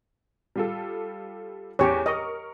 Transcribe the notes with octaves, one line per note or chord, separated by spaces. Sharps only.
G3 F4 A4
E2 C#4 G4 C#5
A#4 D#5 C#6